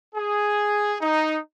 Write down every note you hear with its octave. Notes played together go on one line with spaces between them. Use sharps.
G#4
D#4